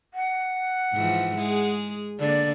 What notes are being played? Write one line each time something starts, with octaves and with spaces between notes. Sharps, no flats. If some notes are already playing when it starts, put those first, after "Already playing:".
F#5
G#2 E3 F3
G#3 G#4
D3 A#3 D5